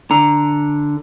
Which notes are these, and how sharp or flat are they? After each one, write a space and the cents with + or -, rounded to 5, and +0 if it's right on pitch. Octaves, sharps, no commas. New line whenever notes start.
D3 +0 A#5 +0